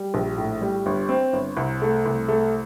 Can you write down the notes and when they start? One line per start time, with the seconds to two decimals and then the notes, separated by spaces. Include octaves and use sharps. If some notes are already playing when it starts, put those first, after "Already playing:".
Already playing: G3
0.14 A#1
0.38 A2
0.62 G3
0.86 G1
1.09 C4
1.33 G1
1.57 C2
1.82 A3
2.06 C2
2.28 A3